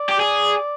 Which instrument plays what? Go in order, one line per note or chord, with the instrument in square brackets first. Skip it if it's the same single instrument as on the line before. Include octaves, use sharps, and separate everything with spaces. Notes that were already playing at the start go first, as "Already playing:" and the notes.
Already playing: [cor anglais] D5
[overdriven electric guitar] G4
G#4